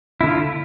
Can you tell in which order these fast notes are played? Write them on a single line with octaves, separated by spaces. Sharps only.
E4 D3 F4